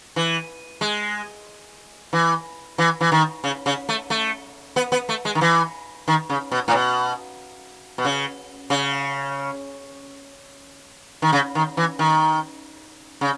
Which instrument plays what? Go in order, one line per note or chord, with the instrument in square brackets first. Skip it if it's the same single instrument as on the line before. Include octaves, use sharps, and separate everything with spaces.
[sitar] E3
G#3
E3
E3
E3
D#3
C#3
C#3
A3
A3
B3
B3
A3
G#3
D#3
E3
D#3
C#3
B2
A2
B2
B2
C#3
C#3
D#3
C#3
D#3
E3
D#3
C#3